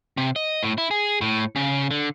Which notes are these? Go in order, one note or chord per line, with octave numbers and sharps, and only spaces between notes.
C3
D#5
A2
E4
G#4
A2
C#3
D3